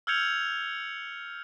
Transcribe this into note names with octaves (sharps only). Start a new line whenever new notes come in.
E6 F6 G6 G#6 C#7 F7